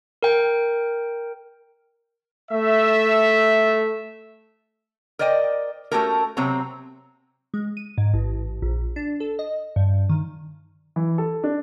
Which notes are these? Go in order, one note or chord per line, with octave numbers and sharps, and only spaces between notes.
A#4 G5
A3 E5
A#4 C5 D5 D#5 G5
A3 C#4 F#4 G4 A4 A#4
C3 F#3 C4 F#4 C#5 A#5
G#3
D#7
G#2
A1
A#1
D4
A4
D#5
G2
D#3
E3
A4
D4